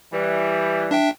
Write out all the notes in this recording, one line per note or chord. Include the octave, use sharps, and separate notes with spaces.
E3 G3
D4 E5 G5